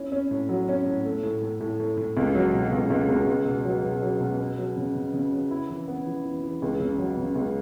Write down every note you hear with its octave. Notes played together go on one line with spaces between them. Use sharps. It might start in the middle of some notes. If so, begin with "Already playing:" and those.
Already playing: C#4 E4
C#4
A2
F#3
C#4
A2
A3
A2
A2
A2
A2
A2
C#2
F#3
B2
C#2
C#2
C#2
C#2
B2
F#3
B2
F#3
B2
B3
F#3
C#3
C#3
C#3
C#3
E4
E3
B3
E3
E3
E3
C#2
C#3
F#3
C#3
C#2